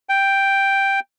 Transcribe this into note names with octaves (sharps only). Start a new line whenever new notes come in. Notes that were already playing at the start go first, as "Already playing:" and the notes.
G5